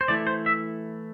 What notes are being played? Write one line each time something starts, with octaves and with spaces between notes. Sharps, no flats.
C5
E3 A3 E4 D5
C5
E5